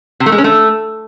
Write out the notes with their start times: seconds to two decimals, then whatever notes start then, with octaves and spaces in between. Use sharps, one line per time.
0.20 C3
0.26 A3
0.32 G#3
0.38 C#4
0.44 A3